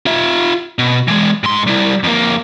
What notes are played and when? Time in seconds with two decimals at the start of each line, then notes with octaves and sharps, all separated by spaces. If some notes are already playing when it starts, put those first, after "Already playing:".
0.06 F4 E5
0.79 B2
1.08 E3 G#3
1.44 G#2 C6
1.67 G3 E4
2.03 F2 A#3